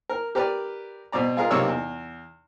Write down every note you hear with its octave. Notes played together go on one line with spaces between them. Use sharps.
A#4
G4 A#4 B4 D5
B2 C4 D5 A#5
G#3 F4 G#4 A#4
B1 C3 A#3 C#5 D5 E6
E2